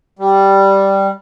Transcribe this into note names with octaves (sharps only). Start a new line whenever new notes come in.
G3